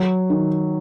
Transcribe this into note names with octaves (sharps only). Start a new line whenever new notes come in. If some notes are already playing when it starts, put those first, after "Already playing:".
Already playing: F#3
D#3